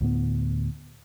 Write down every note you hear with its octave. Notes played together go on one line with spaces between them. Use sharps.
D2 A2 B3